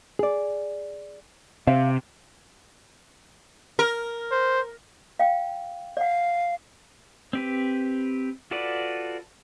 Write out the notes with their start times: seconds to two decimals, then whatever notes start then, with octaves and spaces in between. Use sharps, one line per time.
0.19 G#4 D5
1.67 C3 C5 E5 F5
3.79 A#4
4.31 C5
5.19 F5 G5
5.97 D5 F5 F#5
7.33 C4 G4 B4
8.51 F4 F#4 A4 B4 D5